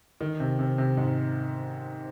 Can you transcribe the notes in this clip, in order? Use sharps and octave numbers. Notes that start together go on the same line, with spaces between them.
D#3
C3
C3
C3
G#2